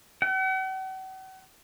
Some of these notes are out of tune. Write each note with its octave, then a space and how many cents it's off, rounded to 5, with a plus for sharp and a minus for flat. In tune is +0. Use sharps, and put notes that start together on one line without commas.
F#5 +45